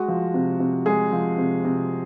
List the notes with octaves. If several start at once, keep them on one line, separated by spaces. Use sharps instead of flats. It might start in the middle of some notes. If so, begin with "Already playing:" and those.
Already playing: G#3 F#4
F3
C3
C3
G#3 G#4
F3
C3
C3